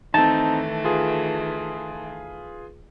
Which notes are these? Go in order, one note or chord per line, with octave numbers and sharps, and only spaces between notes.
D#3 E3 A3 C4 D#4 A5
F4 G#4 B4